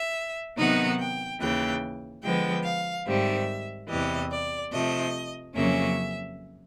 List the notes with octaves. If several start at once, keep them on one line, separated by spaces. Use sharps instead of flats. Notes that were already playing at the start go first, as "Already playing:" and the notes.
Already playing: E5
C3 D#3 F#3 B3 D#4 F#5
G5
D#2 C#3 E3 G5
D3 F3 G#3 B3 G5
F5
G#2 D#3 G3 C4 E5
E2 C3 E3 G3 D#5
D5
C3 F3 A3 D#5
F2 C#3 F#3 A#3 C#4 E5